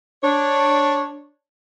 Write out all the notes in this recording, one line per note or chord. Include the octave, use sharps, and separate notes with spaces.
D4 C#5